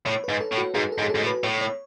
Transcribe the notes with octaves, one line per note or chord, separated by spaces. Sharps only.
A2 C#5
G#2 B4
A4
A2
F#4
G#2 G#4
A4
G#2
G#4
A4
G#2
A2
B4
A2 C#5
C#5